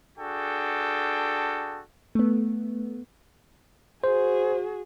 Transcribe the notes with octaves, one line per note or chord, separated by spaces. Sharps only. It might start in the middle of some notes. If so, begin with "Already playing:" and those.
D4 F#4 G#4 A4 G5
A3 B3
F#4 G#4 C5